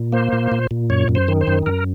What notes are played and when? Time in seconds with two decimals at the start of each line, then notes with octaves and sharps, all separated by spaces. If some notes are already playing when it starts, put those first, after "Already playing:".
Already playing: A#2
0.12 A#3 C5
0.33 A#2
0.52 A#2
0.71 A#2
0.90 F#2 C#5
1.09 F#2
1.15 C5
1.28 D#3
1.41 C5
1.47 F#2
1.66 F#2 A#4